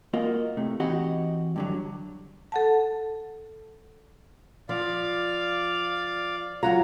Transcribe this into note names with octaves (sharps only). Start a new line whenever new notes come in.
A#3 F4 F#4 D#5
A2 C3 A3
E3 C4 D#4 F#4 G4 D#5
G2 D3 F#3
A4 F#5 A5
F3 D5 F5
F#3 F4 F#4 C#5 A#5